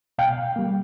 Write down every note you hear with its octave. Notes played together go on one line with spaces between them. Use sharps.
B2 F5 G5
G3 A#3